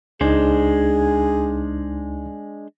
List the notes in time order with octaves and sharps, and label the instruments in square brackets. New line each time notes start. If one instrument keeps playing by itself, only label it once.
[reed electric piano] C#2 D#4 [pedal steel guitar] G#3 D4 C5 [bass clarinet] G#4